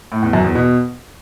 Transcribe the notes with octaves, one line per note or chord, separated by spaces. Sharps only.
A2
E2
F#2
E2
B2